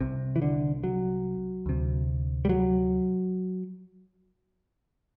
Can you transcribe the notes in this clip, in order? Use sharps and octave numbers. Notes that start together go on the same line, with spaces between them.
C2 C3
E3
D3
F#3
D2 C3
G3
F#3